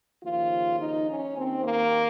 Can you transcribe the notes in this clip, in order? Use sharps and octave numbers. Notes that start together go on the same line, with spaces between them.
D#2 C#3 F3 F4
D#4
C#4
D#2 D#3 C4
A#3